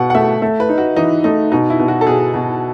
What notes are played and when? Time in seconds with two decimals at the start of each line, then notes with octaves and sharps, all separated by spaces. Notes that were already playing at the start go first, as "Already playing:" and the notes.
Already playing: B2 F#5
0.10 F#5
0.15 A3 E5
0.42 A3 E5
0.60 B4
0.69 D#4
0.78 F#4
0.96 E3 D#4
1.24 A3 D#4
1.52 B2 D#4
1.70 E4
1.79 B2
1.88 F#4
2.01 A4
2.07 B2 G#4
2.34 B2